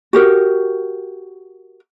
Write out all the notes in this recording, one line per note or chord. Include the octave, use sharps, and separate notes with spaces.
F#4 G4 A#4